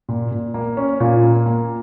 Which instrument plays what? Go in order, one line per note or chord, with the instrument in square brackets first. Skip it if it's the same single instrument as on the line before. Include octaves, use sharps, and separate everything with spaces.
[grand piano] A#2
A#2
A#3
C#4
[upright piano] A#2 [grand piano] C#4
[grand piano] A#3
A#3